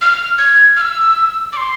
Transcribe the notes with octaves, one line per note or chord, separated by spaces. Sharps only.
F6
G#6
F6
E6
D6
C6